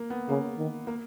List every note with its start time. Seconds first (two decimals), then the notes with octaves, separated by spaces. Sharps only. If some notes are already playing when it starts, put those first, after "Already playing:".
Already playing: A#3
0.10 B3
0.29 C#3 A#3
0.57 D#3
0.87 A#3